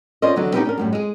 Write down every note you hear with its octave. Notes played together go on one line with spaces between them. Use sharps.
C#4 F4 A#4 C5 D5 D#5
E2 D3 F#3 B3
B3 C#4 D#4 G4 A4 B4
C#4 D4 A#4
F#2 A2 G3
G#3 G#4